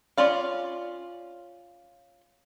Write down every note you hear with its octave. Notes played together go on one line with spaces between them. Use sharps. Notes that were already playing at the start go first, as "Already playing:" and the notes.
C#4 F4 D5 F5